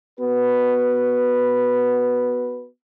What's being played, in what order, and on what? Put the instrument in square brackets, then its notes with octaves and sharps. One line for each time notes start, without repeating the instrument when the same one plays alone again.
[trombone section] B3 F#4 B4